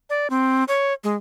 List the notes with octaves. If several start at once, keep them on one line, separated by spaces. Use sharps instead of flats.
D5
C4
C#5
G#3